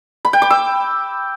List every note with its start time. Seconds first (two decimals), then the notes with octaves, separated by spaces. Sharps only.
0.25 B5
0.33 G5
0.42 D6
0.50 E6